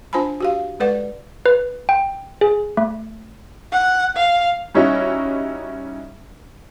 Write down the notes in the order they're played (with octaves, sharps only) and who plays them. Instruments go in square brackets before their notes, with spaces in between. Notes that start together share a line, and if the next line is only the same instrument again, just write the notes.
[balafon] D4 F4 C5 G#5 A5 B5
F#4 G4 F5
G#3 A4 B4 D5 F#5
[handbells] B4
G5
G#4
A3
[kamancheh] F#5
F5
[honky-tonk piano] G3 C#4 D#4 E4 F#4